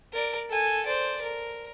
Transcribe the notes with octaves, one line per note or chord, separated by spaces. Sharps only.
A#4 D5
A4 G#5
C5 D5
A#4